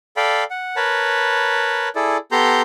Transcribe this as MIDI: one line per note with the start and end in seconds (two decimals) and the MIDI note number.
0.17 0.44 69
0.17 0.44 74
0.17 0.44 77
0.17 0.44 79
0.17 0.44 83
0.50 0.76 78
0.76 1.89 70
0.76 1.89 71
0.76 1.89 73
0.76 1.89 81
0.76 1.89 83
1.96 2.17 64
1.96 2.17 68
1.96 2.17 69
1.96 2.17 74
2.32 2.62 59
2.32 2.62 67
2.32 2.62 69
2.32 2.62 82
2.32 2.62 84
2.32 2.62 91